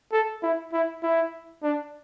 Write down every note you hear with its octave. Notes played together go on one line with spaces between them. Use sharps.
A4
E4
E4
E4
D4